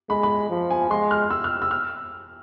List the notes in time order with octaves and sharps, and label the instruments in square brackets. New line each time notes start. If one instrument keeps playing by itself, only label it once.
[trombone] G#3 [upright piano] B5
[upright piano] B5
[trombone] F3
[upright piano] G#5
[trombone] G#3 [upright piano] C6
[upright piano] F6
E6
F6
E6
F6